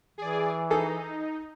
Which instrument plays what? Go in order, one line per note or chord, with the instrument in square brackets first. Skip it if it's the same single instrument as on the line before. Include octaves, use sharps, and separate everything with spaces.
[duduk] E3 [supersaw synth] G#4 D5
[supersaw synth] D#4 [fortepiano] G#4 A4